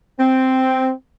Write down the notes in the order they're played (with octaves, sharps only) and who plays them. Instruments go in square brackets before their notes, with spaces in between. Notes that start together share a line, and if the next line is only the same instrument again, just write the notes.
[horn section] C4